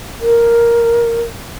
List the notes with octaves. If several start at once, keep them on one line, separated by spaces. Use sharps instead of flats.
A#4